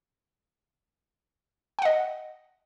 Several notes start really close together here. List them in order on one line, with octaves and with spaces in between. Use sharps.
G5 F#5 D#5